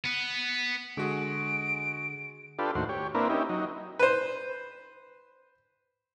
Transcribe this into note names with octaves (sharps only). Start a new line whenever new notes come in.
B3
D3 G#3 F#4 G#4 D7
D4 F4 G4 A4 B4
D#2 A2 F#4 C5
G4 C#5
A#3 C4 D4 E4 A#4 B4
C#4 D#4 E4 G4
F#3 D#4
B4 C5